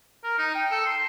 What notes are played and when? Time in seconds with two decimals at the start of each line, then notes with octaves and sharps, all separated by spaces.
0.24 A#4
0.39 D#4
0.55 G5
0.71 A4
0.86 C6